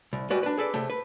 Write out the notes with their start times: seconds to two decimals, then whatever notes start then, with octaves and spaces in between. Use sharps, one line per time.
0.13 C2
0.30 G3 G#3 F#4 B4 D5
0.43 D4 B4
0.57 G#4 A4 B4 D5
0.74 C3 A3
0.90 B4